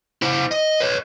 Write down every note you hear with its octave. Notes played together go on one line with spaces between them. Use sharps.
E4 C5
D#5
B4 C#5